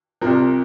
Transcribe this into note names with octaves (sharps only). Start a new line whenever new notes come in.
C2 C3 F3 A#4